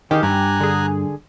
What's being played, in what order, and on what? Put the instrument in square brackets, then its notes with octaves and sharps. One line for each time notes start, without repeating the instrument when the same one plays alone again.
[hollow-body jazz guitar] D#3 [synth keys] G4 [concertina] G#4 F5
[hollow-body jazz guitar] G2 [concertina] G#5 A#5 F#6
[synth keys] D3 G#4